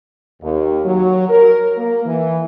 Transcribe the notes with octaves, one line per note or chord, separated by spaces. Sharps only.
D#2
F#3
A#4
A#3
E3